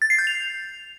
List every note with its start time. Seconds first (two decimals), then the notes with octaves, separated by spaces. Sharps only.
0.02 A6
0.10 C7
0.19 G6
0.27 F7